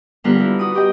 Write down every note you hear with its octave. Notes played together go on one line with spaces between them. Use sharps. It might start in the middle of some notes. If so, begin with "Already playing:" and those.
D3 G3 B3 F4 A#4 B4
G3 E4
F#4 D#6
F#4 G4 D#5 G5